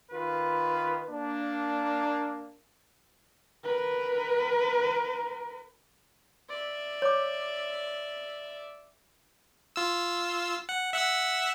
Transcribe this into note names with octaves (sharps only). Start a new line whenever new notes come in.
D#3 F4 B4
A#3 D4
A#4 B4
D5 E5
C#5 D6
F4 E6
F#5
E5 F#5 E6